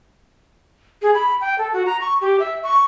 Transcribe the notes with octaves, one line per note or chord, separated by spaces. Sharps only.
G#4
B5
G5
A4
F#4
A#5
C#6
G4
E5
C#6